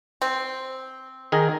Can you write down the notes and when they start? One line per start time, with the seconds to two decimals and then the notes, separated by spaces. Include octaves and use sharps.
0.22 C4
1.32 D#3 G#4 A#4